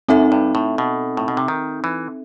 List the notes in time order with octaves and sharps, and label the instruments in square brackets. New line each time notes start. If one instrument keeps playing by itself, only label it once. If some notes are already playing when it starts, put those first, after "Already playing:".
[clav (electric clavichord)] F#2 [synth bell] C4 D#4 A4 E5
[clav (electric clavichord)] G2
A2
B2
A2
B2
C3
D#3
E3